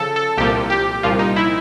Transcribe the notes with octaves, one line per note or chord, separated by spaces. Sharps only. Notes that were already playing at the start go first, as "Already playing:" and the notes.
Already playing: C#3 F3 A4
A4
C2 A#2 F3 G4
G4
C2 A#2 F3 F4
D#4
E4